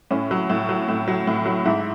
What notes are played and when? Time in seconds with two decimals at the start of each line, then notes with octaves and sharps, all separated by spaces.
0.11 A2 C#4
0.31 F#3
0.50 A2
0.69 F#3
0.88 A2
1.08 F#3
1.27 A2
1.45 F#3
1.65 G#2 E4